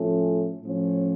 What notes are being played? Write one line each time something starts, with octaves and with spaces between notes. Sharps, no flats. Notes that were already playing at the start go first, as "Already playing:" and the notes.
Already playing: A2 F3 A3 C#4
A2 F3 C#4